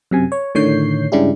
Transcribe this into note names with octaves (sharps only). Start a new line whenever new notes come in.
F#2 C3 G#5
C#5
A2 D3 D#3 C#5 G6 C7
G2 C#3 G#3 D4 E4 G4